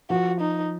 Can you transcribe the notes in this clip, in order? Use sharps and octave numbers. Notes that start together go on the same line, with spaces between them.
F3 F#4
D#4